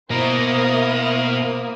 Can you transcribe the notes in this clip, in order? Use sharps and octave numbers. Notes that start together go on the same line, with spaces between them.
B2 A#3 E4 A#4 C5 D#6